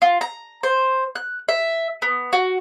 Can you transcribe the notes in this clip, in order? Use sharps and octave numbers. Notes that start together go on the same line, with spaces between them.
F4
A#5
C5
F#6
E5
B3
F#4